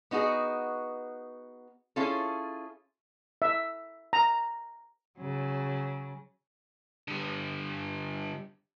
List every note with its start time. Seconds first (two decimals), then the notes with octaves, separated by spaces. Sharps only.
0.11 B3 D#4 F#4 G#4
1.96 C#4 E4 F4 G#4 A4
3.42 E5
4.13 A#5
5.18 C#3 F#3
7.08 D3 G3